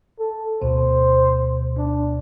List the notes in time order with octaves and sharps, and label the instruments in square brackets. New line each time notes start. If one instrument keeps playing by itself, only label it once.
[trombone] A4
[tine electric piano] D2 B2 [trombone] C5
[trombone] D4